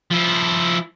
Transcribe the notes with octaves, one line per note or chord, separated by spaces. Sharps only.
F3 E4